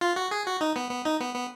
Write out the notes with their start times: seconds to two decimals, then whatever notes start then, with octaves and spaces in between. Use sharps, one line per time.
0.01 F4
0.16 F#4
0.31 G#4
0.46 F#4
0.61 D#4
0.76 B3
0.90 B3
1.05 D#4
1.20 B3
1.35 B3